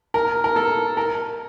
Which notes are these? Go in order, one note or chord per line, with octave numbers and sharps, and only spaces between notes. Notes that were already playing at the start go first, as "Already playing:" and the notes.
A#4
A#4
A4
A#4